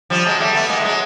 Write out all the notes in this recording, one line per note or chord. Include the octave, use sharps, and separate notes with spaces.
F3 G3
F#3 G#3
G3 A3
A3 B3
G#3 A#3
A3
F#3 G#3